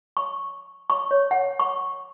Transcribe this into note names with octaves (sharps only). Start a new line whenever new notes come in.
C#6
C#6
C#5
F#5
C#6